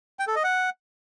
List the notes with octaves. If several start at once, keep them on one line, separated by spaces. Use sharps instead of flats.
G5
A4
D#5
F#5